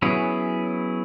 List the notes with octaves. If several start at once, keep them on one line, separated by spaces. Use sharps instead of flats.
F#3 B3 C#4 E4 G#4